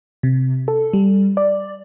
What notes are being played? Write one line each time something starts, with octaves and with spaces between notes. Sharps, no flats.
C3
A4
G3
D5